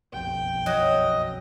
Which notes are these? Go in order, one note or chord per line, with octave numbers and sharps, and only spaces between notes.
F#1 B1 F2 G5
F#3 D#5